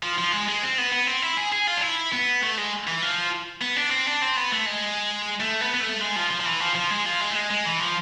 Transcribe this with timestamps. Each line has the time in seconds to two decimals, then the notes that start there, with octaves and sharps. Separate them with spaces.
0.03 F3
0.18 F3
0.32 G#3
0.48 G#3
0.63 C4
0.78 B3
0.92 B3
1.07 C4
1.22 E4
1.37 G#4
1.52 G#4
1.67 F4
1.77 D4
1.82 E4
2.13 B3
2.43 A3
2.57 G#3
2.87 E3
3.02 F3
3.62 B3
3.77 D4
3.91 C4
4.07 D4
4.22 C4
4.36 B3
4.52 A3
4.66 G#3
5.40 A3
5.61 B3
5.74 B3
5.80 A3
6.01 G#3
6.16 F3
6.30 F3
6.41 F3
6.46 E3
6.60 F3
6.75 F3
6.90 G#3
7.06 F3
7.20 G#3
7.30 A3
7.36 G#3
7.51 G#3
7.66 E3
7.80 F3